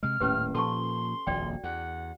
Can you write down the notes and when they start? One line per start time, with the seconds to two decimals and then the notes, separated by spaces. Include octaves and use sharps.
0.03 C3 G#3 F6
0.20 D#1 A2 A#3 C#4 G4 B4
0.54 A#2 F3 A4 A5 C6 C#6
1.27 D#1 A#1 F2 F#4 D5 G5
1.64 E2 F#5